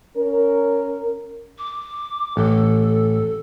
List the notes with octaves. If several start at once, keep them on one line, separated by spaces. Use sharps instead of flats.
C#4 A#4
D6
A1 A4